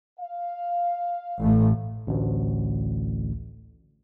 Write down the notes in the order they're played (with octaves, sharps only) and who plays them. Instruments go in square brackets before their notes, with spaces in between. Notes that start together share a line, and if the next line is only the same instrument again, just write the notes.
[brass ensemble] F5
[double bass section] A1 A2
[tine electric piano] A1 D2